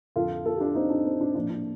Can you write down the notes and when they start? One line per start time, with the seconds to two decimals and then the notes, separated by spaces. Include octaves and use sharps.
0.16 F2 D3 F3 F4 A4
0.46 F4 A4
0.56 G4
0.60 D4 F4
0.75 C4 D#4
0.90 D4
1.05 C4
1.21 D4
1.35 A#2 F3 D4
1.50 D4